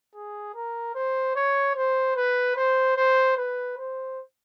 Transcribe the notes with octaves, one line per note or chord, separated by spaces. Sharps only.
G#4
A#4
C5
C#5
C5
B4
C5
C5
B4
C5